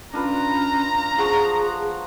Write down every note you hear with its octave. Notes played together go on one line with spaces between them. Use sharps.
C#4 D4 F4 B4 A#5
F3 G#4 F#5 C#6